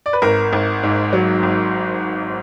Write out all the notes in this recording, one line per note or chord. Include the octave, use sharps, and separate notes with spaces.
D5
B4
G#1 A#4
G#1
G#2
F#3
G#1